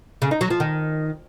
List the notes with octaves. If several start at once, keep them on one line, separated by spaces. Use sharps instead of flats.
C#3
D#4
F#3
F3
D#3